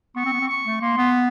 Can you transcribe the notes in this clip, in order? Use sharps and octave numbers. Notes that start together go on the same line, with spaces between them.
B3 C#6
C4
B3
C4
C#6
A3
A#3 C6
B3